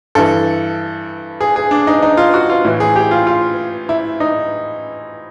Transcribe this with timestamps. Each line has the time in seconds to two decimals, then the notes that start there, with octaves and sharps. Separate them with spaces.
0.15 G2 E3 A4
1.41 G#4
1.56 G#4
1.71 D4
1.87 D#4
2.02 D#4
2.17 F4
2.34 F#4
2.49 F4
2.65 A2 E3
2.80 G#4
2.96 G4
3.11 F4
3.27 F4
3.89 E4
4.20 D#4